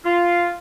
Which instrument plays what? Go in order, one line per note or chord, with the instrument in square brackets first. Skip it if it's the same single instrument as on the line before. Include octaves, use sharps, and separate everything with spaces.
[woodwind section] F4